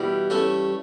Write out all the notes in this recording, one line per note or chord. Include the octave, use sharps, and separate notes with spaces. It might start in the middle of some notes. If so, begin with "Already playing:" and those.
Already playing: B2 E3 G3
A3 C#4 E4